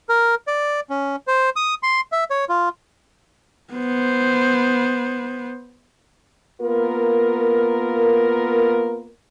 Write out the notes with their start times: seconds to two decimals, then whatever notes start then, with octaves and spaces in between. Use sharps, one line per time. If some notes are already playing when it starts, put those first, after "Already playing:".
0.09 A#4
0.47 D5
0.90 C#4
1.27 C5
1.56 D#6
1.83 C6
2.12 E5
2.31 C#5
2.49 F4
3.73 B3 C5
6.61 A#3 B3 F4 A#4